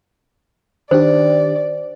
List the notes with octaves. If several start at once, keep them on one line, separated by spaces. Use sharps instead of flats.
D#3 D4 G4 C5 D5